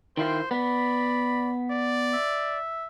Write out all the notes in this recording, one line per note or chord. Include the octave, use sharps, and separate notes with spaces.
D#3 E4 F4 C5 G5
B3 D5 B5
D5
E5